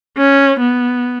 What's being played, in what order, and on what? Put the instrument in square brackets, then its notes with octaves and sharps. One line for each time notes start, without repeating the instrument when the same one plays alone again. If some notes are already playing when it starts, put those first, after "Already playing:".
[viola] C#4
B3